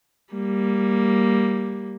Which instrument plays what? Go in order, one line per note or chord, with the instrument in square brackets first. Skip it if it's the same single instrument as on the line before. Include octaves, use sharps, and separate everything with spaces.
[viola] G3 A#3